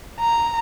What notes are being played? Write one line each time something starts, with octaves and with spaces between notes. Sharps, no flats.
A#5